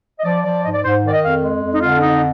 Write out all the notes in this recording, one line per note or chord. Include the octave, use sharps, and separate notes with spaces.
D#5
F3 D5
F3 D5
G#2 D#5
D5
G#2 C5
D#3
D5
D#5
F2 F5
G#3
F2
D#4
D3 F4
D4
F2 D#4